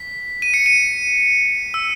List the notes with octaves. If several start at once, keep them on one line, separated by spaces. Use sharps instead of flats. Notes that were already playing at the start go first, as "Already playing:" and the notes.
Already playing: B6
D#7
C#7
D#7
E6